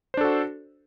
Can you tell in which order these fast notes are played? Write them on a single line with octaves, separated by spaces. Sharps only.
C5 D4 A4 F#4